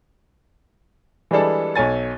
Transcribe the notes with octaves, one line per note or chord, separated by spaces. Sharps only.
E3 G3 G#3 D4 A4
B1 A4 C#5 G#5 A6